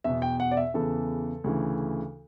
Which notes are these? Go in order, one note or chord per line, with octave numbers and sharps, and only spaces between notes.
E2 B2 E5
G5
F#5
D5
E5
E2 C#3 E3 A4
D2 C#3 E3